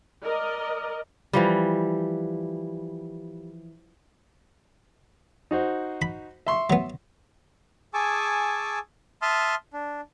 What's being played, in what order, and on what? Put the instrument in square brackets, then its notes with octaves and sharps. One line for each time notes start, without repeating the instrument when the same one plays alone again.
[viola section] A#4 D5 D#5
[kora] E3 F3 G3
[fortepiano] D#4 F#4 C5
[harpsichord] B5
[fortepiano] E5 C6 C#6
[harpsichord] F#3 B3
[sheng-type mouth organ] G#4 G#5 A5 C#6 D6 E6
E5 A5 C6 D#6 F6
D4